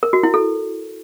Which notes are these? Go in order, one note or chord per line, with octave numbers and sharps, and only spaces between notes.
A#4
F#4
E4
A4